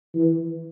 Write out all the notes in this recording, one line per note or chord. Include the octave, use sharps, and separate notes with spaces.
E3